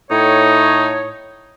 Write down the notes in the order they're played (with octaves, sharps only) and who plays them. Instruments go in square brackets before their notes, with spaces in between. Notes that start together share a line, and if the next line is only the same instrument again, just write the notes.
[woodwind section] A2 C#5 [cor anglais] D#4